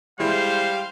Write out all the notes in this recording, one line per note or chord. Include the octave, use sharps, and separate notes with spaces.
E3 G3 G#3 E4 C5 F5